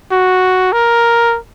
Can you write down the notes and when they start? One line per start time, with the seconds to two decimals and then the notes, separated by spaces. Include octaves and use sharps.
0.11 F#4
0.73 A#4